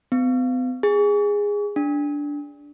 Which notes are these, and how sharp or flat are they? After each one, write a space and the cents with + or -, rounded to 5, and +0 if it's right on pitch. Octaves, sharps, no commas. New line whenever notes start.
B3 +45
G#4 -15
D4 -10